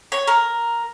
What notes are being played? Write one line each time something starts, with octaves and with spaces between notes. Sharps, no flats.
C#5
A#4